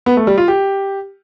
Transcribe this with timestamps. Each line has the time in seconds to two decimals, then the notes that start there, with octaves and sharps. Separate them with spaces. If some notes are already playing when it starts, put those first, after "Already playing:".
0.06 B3
0.17 A3
0.27 G3
0.38 F4
0.48 G4